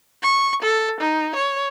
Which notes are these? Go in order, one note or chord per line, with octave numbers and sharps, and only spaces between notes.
C#6
A4
D#4
C#5